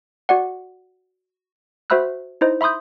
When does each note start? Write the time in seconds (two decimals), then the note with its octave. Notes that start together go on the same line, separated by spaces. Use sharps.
0.29 F#4 D5 F#5
1.90 F#4 C5 E5 B5 E6 F#6
2.41 D#4 E4 C5 D#5
2.61 E5 B5 C6 D#6 G6